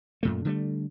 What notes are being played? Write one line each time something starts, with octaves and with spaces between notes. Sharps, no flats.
F#2 A#2 A3
D3 G3 A3